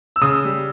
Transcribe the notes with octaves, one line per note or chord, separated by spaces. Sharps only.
E6
C#3 D#6
G3